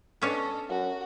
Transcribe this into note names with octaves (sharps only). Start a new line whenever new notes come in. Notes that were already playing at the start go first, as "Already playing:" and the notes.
B3 C#4 D4 A4 D#5
F#2 F#4